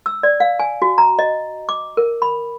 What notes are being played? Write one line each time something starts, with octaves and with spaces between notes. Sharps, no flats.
E6
D5
F5
G#5
F#4
A#5
D#5
D6
A#4
B5